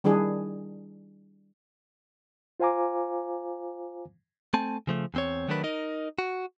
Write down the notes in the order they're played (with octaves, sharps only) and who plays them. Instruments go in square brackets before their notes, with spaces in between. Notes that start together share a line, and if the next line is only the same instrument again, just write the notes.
[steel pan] D#3 G3 D4 E4 G#4
[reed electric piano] F4 C5 F5 G#5 A#5 D6
[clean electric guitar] A3 C4 G#5 A5
C#3 F3 A3
E2 C4 C#5
D#3 F#3 A3 D4 A#4 B4
D#4 A#4 D#5
F#4